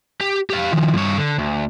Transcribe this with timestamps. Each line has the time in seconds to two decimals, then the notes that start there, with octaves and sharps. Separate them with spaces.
0.21 G4
0.50 G4 F5
0.72 D#3 F3
0.95 G2 C#5
1.18 D3
1.38 D2